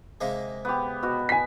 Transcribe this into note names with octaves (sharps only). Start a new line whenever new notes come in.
C3 G#3 A#3
B3 G4
B2 F#4
G#5 B6